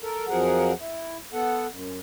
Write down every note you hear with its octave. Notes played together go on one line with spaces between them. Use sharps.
A4 A#4
F2 F3 F#3 G#4 A#4 F#5
E4
B3 A4 F#5
F#2